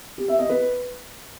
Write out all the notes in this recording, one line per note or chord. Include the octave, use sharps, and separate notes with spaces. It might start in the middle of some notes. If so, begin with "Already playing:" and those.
G4
E5
D#5
B4